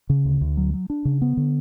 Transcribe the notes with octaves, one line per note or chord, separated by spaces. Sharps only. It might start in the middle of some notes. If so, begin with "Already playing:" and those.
C#3
D2
D2
F#3
F#3
D4
C#3
B3
D3